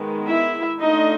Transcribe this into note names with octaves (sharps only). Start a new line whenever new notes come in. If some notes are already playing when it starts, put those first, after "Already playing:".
Already playing: D#3 G#3 B3
E4 E5
A3 D4 D#4 F4 D#5